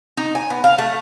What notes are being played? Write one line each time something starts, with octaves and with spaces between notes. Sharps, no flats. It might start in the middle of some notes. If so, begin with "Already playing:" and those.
D#4
G#5
B3
F5
A3